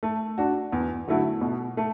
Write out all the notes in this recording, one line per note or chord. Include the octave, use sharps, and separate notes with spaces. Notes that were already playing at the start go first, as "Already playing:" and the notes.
A3
D4 F#4
E2
D3 F#3 A3 E4
B2
A3